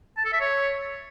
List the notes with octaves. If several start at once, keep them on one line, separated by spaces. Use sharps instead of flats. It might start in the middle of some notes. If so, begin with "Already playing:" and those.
A5
A4
E5
C#5